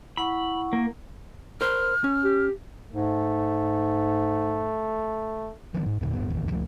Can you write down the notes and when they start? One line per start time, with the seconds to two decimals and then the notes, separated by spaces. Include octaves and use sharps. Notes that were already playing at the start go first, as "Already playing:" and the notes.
0.17 E4 F#5 B5 C#6
0.73 A#3
1.61 A#4 C5 F6
2.04 C#4
2.24 G4
2.93 G#2 A3
5.74 D#3 F3 F#3 B3
5.86 G#2
6.01 D#2 A#2 D3
6.13 D1 G1 G2 B3
6.30 E1 A1 D#2
6.51 C#2 F3 G#3 A3